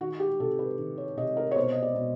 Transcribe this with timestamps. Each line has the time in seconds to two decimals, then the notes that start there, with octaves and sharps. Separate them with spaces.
0.01 D#3 F#4
0.20 G4
0.40 C3 A4
0.59 B4
0.78 D#3
0.98 C#5
1.17 C3 D#5
1.37 A#4
1.51 C#5
1.56 B2 C5
1.73 D#5
1.82 D5
1.95 B2